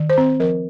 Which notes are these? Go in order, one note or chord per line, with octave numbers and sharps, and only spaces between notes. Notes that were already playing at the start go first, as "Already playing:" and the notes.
Already playing: D#3
C5
C4
F3 A#4